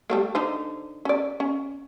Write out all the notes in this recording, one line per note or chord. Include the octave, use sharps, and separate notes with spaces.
G3 A3 A#3
D3 D#4 C5
C#4 D5
C#4